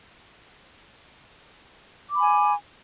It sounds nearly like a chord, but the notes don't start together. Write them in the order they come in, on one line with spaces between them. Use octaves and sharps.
D6 B5 G#5